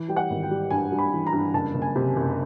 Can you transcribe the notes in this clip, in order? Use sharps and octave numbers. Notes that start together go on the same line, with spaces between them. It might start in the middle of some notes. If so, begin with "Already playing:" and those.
Already playing: E3
G3 G5
F#5
G#1
G5
G3
G2 G#5
G2
B5
E3
A#5
G2
F#1 A5
F#1
G#5
C3
F#1